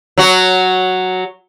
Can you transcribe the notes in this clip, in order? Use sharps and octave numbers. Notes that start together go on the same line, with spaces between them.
F#3 F#4